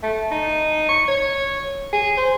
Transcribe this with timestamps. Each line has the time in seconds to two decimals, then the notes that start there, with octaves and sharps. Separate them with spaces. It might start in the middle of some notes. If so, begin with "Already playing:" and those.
0.03 A3
0.31 D#4
0.89 C#6
1.08 C#5
1.93 G#4
2.17 C5